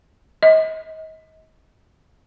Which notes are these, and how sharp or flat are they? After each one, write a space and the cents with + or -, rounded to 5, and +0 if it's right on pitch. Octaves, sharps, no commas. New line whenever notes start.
D#5 +30